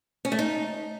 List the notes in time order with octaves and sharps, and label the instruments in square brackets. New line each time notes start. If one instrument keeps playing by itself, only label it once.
[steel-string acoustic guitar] C#4
A3
D#4